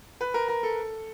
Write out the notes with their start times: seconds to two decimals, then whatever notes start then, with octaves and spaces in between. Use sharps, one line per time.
0.21 B4
0.34 A#4
0.48 A#4
0.63 A4